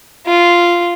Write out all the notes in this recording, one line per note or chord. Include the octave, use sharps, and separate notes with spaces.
F4